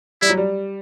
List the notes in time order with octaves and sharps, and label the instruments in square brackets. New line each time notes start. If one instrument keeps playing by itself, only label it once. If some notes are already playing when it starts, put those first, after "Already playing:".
[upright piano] G3 [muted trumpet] E4
[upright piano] F#3
G3